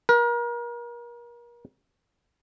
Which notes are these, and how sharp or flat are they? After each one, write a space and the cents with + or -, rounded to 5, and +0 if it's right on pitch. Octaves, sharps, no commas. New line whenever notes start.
A#4 +35